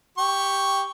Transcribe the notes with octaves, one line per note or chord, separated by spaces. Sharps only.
G4 C#6